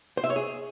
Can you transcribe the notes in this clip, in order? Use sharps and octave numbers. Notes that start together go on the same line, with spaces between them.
C5
E5
C#5
G#4